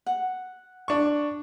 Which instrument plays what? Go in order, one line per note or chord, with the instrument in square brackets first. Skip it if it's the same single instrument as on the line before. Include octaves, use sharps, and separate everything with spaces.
[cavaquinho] F#5
[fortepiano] D4 C#6